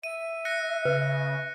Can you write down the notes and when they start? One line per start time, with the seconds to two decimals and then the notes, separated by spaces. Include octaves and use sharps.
0.03 E5 D#7
0.45 F#6 A#6 C#7
0.85 C#3 B4